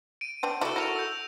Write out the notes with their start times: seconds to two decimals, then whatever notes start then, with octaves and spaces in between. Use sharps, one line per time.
0.21 D7 D#7
0.43 B3 C4 D4
0.61 E4 F#4 A4 D5
0.76 E4 A#4 A#6 F7
0.96 E6 G6